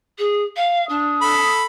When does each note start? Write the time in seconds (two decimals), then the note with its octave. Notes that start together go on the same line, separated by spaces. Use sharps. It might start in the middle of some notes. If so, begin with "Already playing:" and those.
0.18 G#4
0.56 F5
0.89 D4 D#6
1.21 A4 B5